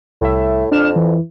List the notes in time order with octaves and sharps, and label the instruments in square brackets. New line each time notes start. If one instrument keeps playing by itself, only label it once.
[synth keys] C2 E5 [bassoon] A2
[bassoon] F2 [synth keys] D4 F6 E7
[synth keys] E3